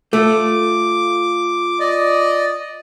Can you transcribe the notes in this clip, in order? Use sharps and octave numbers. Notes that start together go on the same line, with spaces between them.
A3 F4 D6
D5 D#5